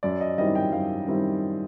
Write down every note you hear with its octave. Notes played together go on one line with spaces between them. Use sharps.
F#2 D5
D#5
D#3 G3 C4 E4 D#5
G5
F#2 F5
D#3 G3 C4 E4